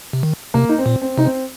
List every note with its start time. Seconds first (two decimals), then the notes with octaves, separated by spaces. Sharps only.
0.13 C3
0.23 D#3
0.54 C3 A#3
0.69 D#4
0.78 C4
0.86 A#2
1.02 C4
1.18 C3 D#4
1.25 C4